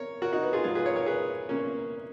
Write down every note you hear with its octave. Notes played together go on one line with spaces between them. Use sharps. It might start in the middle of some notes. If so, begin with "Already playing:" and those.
Already playing: A#4 C#5
F#4 A#4
D#4 F#4
B3
F4 G#4
G#2 F3 G#3 F4 G#4
G#4 B4
A#4 C#5
A#4 C#5
G#4 B4
A#3 C#4